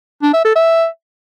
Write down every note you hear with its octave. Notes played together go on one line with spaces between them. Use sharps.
D4
E5
A4
E5